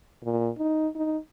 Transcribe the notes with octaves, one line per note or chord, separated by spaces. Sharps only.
A#2
D#4
D#4